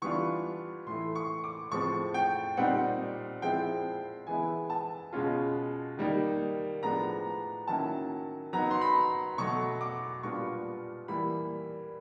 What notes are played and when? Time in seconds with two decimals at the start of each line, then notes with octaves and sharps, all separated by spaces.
0.02 E3 G3 B3 D4 F4 C#6
0.86 A2 E3 A3 C6
1.15 C#6
1.44 D6
1.71 A2 F3 G#3 C4 C#6
2.14 G5
2.57 A#2 G3 C4 D#4 F#5
3.42 F3 G#3 C4 E4 G5
4.27 E3 G#3 B3 E4 G#5
4.70 A5
5.13 B2 G#3 C#4 F4
5.97 D#3 G3 A#3 D#4
6.83 A2 F3 G#3 B3 D4 A#5
7.68 D#3 F#3 A#3 C#4 E4 A5
8.53 F#3 B3 D#4 A#5
8.71 C6
8.81 B5
9.38 B2 F#3 A3 C#6
9.81 D6
10.23 A#2 G3 B3 D4 F4 C#6
11.08 E3 G3 A#3 B5